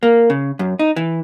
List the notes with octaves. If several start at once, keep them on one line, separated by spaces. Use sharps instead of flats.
A#3
C#3
F#2
D#4
E3